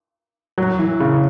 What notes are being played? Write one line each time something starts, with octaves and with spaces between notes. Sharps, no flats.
F#3
E3
C#3